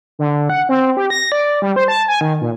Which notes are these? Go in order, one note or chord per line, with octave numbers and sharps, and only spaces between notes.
D3
F#5
C4
G4
A#6
D5
G3
C5
A5
G#5
D#3
A#2